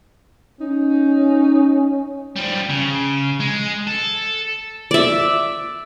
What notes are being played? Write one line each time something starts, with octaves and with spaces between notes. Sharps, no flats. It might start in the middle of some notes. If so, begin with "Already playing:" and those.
C#4 D#4
F3 G3
C#3
G#3
A4
D5 E5